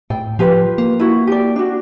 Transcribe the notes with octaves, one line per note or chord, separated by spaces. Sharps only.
A2 G5
F3 F4 G4 B4
A#3
E4 F#4
G4 D5
D4 F#4